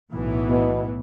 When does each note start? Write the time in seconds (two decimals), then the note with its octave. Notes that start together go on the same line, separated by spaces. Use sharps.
0.12 B1 A2 E3 B3
0.49 B2